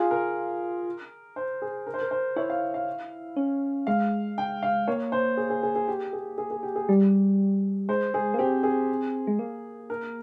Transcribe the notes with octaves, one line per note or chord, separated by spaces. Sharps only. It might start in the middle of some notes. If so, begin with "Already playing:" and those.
Already playing: F4 G#4
A#4
C5
G#4
A#4
C5
A#4
C5
E4 C#5
F5
F5
C#4
G#3 F5
G5
F5
A#3 C#5
C5
G#4
G#4
G#4
G#4
G4
G#4
G#4
G#4
G4
G#4
G3
G#3 C5
G#3 G#4
A#3
C4 G4
G#4
G#3
A#3
A#4